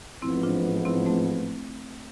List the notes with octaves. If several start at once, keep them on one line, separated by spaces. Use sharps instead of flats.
A1 G#2 F3 B3 C4 E4
D4 F4
C4 E4
A3 C4